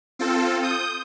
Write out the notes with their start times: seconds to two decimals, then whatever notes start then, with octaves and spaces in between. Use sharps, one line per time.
0.19 C4 F4 A4
0.63 D#6 G6